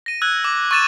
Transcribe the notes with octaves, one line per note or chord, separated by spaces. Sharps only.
A#6 D#7
E6 F#6 G#6
D6
C#6 E6 A6 D#7 E7